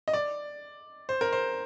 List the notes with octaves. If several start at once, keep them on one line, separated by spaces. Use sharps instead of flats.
D#5
D5
C5
A#4
C5